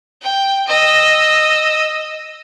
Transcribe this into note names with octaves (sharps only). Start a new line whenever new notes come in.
G5
D#5 E6